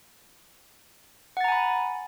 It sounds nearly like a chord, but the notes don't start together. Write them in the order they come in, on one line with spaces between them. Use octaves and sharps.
F#5 A6 A#5 G#5 B5